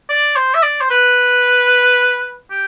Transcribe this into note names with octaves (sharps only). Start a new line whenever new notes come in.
D5
C5
E5
D5
C5
B4
G4